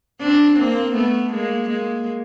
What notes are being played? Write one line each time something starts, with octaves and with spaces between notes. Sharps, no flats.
C4 D4
A#3 C4
A3 B3
G#3 A#3
G#3 A#3